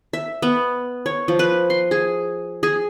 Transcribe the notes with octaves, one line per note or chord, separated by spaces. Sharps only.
E5
B3
C#5
F3
B4
C6
G#4
G#4